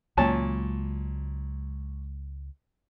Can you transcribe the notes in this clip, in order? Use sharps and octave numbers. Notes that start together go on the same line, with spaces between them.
C#2 A#2 F#3 G#3 C#4 A5